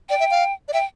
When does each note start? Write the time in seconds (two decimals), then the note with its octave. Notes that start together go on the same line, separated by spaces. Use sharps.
0.09 D5 G5
0.20 E5
0.31 F5
0.68 D5
0.73 E5 G5